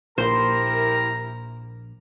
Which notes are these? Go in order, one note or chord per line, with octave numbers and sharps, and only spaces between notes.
A#1 E4 G4 A#4 C5 A#5